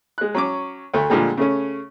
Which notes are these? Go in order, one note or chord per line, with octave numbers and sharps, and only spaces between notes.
G#3 F#6
F#3 C#4 D6
D2 A3
A#2 D3 F3 G3 G#3
C#3 A3 C#4